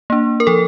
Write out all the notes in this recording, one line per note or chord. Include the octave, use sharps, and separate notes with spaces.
A#3 D4
A#4
F3 A4